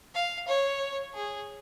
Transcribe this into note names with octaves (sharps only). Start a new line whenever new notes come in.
F5
C#5
G#4